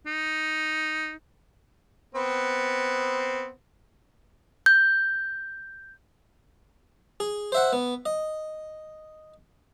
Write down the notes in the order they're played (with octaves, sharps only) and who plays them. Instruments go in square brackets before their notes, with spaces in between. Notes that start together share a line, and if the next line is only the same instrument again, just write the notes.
[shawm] D#4
[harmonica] B3 C4
[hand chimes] G6
[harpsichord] G#4
C5 E5 F#5
B3
D#5